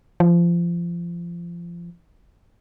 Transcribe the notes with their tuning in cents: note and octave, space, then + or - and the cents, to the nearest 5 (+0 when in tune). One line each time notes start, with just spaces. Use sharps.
F3 -25